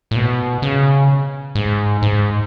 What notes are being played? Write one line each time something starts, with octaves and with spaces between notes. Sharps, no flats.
A2
B2
C#3
G#2
G#2